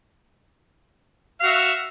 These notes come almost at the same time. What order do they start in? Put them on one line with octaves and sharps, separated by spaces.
F5 F#4 E5